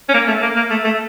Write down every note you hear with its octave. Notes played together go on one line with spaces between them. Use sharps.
C#4
A#3
A3
A#3
A#3
A3
A3